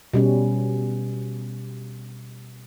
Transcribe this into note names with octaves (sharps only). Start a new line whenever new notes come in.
B2 G3 C#4